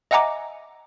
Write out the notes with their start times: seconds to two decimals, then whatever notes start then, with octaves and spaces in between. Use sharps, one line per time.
0.11 D#5 E5 F#5 G#5 A#5 D6